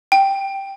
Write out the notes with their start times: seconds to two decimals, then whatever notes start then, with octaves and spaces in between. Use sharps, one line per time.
0.12 G5